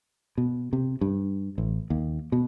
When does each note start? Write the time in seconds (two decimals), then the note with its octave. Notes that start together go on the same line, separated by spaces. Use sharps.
0.38 B2
0.73 C3
1.01 G2
1.58 A1
1.90 D#2
2.32 B2